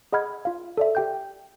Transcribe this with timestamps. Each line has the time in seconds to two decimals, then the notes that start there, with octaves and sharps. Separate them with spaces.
0.12 G#4 D#5 F#5 B5 F6 G#6
0.45 F4 F5
0.77 A4 D5 E5
0.95 G4 G5 G6